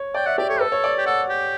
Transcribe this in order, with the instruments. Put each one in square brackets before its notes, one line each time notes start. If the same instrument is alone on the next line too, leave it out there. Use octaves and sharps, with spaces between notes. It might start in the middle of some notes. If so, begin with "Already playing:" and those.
Already playing: [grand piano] C#5
[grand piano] D5 [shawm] G5
[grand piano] E5 [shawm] F#5
[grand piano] G4 [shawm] D5
[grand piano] A4 [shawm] C#5
[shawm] A4 [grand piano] B4
[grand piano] C#5
D5
[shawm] G4
[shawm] A4 [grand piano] F#5
[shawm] G4